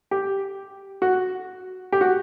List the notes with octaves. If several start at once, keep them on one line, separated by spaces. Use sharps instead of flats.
G4
F#4
G4
F#4